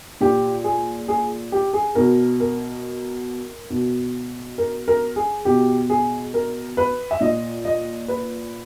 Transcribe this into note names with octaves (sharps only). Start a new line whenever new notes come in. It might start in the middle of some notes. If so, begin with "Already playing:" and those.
A#2 G4
G#4
G#4
G4
G#4
B2 A#4
A#4
B2
A#4
A#4
G#4
B2 G4
G#4
A#4
B4
E5
A#2 D#5
D#5
B4